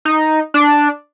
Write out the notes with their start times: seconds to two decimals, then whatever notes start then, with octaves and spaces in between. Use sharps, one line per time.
0.05 D#4
0.54 D4